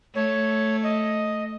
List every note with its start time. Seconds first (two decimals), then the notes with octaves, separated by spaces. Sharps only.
0.15 A3 C#5
0.83 D#5